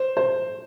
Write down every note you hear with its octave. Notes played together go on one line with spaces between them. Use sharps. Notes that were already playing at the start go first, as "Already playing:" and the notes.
Already playing: C5
C5